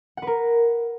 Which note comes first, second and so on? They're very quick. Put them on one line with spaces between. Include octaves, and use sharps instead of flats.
F#5 B4 A#4